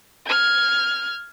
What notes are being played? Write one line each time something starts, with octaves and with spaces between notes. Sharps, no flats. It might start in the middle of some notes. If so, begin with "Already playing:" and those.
F6 G#6